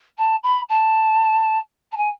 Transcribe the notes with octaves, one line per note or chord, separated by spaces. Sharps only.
A5
B5
A5
A5
G#5